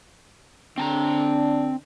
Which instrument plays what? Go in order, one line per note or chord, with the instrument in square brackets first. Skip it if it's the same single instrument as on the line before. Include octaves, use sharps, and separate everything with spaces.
[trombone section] D3 D4 [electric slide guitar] C4 A5 A#5